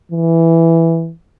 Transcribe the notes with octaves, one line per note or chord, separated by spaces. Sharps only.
E3